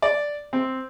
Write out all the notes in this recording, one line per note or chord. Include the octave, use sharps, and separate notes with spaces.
D5
C4